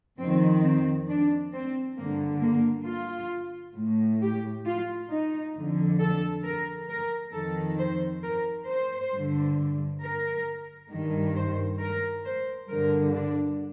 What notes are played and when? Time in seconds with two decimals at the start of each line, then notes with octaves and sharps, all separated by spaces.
0.19 F2 D#3 C4
0.64 C4
1.09 D4
1.53 C4
1.97 G2 D3 A#3
2.42 A#3
2.87 F4
3.76 A2
4.21 G4
4.66 F4
5.11 D#4
5.55 F2 D3
6.00 A4
6.44 A#4
6.89 A#4
7.33 F2 D#3 A4
7.78 C5
8.23 A#4
8.67 C5
9.12 G2 D3
10.01 A#4
10.91 G2 D#3
11.35 C5
11.80 A#4
12.25 C5
12.69 G2 D3 A#4
13.14 D4